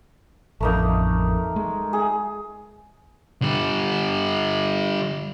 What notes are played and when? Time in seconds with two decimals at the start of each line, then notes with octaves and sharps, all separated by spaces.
0.60 A1 F2 A3 A#3 D#4
1.56 G#3
1.93 G#4
3.42 D3 G3